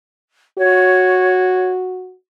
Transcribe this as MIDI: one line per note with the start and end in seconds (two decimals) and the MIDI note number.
0.58 2.15 66
0.58 1.71 73